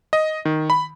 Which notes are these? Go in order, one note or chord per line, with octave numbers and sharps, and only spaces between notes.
D#5
D#3
B5